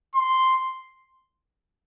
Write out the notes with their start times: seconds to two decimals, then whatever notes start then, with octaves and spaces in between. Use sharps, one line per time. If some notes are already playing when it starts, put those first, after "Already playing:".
0.15 C6